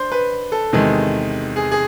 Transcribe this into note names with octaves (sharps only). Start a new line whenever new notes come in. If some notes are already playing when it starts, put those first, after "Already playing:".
Already playing: D4 C5
B4
A4
E2 C3 D#3 G#3
G#4
G#4